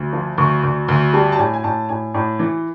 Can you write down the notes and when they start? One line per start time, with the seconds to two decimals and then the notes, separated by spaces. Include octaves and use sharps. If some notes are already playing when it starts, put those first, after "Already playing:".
Already playing: D2
0.13 F3
0.38 D2 C#6
0.63 D2
0.88 D2
1.13 G3 A5
1.32 A5
1.38 A2 G#5
1.53 G#5
1.64 A2 A5
1.89 A2 G#5
2.14 A2
2.39 E3